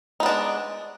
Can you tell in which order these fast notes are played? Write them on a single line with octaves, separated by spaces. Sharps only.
D#4 B3 D4 G#3